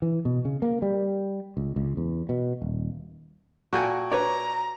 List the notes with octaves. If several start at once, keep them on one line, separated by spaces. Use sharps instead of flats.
E3
B2
C#3
A#3
G3
C#2
C#2
E2
B2
D#1
A#2 F#4 A4 G5 G#5
B4 C#5 D5 A#5